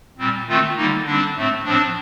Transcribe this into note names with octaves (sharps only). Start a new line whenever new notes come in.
A#2 G3 C4
D#3 A3 C4 F4
D3 G3 A#3 D#4
D3 G3 C4 D4
A2 A3 C4
A2 F3 C4 D4